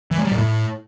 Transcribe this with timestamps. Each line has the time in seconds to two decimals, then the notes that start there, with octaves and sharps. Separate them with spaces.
0.11 E3
0.18 G#3
0.25 G3
0.31 A#2
0.38 A2